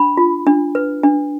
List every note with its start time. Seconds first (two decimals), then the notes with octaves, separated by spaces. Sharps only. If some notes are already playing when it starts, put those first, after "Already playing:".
Already playing: D4 B5
0.17 F4
0.47 D4
0.75 B4
1.03 D4